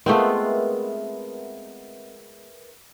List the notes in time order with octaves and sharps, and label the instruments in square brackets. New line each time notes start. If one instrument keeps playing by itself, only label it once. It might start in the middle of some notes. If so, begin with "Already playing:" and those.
[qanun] G#3 B3 F4 [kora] A3 C4 [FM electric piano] A#4 B4 E5